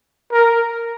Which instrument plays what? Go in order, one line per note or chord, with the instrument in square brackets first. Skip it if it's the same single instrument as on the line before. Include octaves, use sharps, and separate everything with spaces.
[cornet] A#4